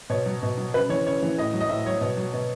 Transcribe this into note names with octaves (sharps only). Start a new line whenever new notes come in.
B2 C#5
F#3
B2
F#3
C#3 B4
E3 C#5
C#3 C#5
E3
A2 D#5
F#3
D#5
A2 E5
F#3 C#5
B2
F#3
B2